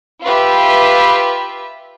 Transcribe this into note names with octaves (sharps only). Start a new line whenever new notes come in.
F4 G4 B4 E5